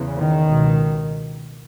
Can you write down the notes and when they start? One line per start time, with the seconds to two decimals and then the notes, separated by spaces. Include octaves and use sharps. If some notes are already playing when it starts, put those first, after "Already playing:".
Already playing: E2 C#3
0.16 D#3
0.44 C#2 B2